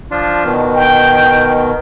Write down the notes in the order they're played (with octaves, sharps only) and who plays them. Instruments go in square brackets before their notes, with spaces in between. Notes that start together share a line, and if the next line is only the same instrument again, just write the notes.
[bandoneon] F3 D4 F4
B2 D#3
[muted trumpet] G5